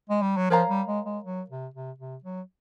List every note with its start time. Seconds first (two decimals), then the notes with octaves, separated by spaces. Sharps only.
0.09 G#3
0.22 G3
0.37 F#3
0.50 F3 A#4 C#5 F5 A#5
0.69 G3
0.87 G#3
1.06 G#3
1.24 F#3
1.50 C3
1.74 C3
1.99 C3
2.24 F#3